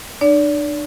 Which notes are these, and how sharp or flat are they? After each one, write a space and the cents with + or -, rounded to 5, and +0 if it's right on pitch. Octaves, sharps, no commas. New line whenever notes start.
D4 +35 D5 -35